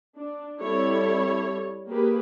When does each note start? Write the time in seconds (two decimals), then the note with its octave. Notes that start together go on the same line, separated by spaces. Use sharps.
0.17 D4
0.60 G3 C4 E4 A4 C#5
1.88 A#3 G4 G#4 B4